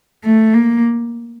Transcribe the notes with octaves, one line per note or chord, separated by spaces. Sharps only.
A3
A#3